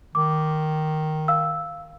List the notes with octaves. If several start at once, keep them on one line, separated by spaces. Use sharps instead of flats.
D#3 D6
F5 E6